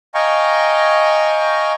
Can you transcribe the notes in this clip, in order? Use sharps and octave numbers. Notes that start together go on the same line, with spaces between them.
D#5 F5 G5 G#5 A#5 C#6